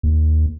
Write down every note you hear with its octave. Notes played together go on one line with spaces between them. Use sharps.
D#2